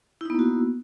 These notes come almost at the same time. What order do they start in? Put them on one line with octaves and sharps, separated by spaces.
E4 D#4 B3 A#3 F#4